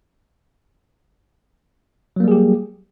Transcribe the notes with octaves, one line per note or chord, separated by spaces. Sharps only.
F#3 G3 A#3 G4 G#4